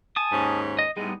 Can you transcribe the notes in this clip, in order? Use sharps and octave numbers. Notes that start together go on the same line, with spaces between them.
G#5 A5 D#6
D#2 G#2 C#4
D#5
A2 G3 G#3 B3 D#4